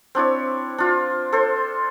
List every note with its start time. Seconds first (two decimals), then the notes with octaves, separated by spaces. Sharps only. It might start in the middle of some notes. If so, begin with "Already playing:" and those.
0.15 C4 D4 E4 C#5
0.78 D4 F4
1.33 A4 C5